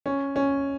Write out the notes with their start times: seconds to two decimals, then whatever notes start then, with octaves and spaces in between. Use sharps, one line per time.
0.06 C#4
0.36 C#4